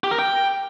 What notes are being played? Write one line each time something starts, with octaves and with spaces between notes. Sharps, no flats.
G4
A#4
G5